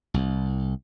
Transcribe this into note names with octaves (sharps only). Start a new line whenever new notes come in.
C2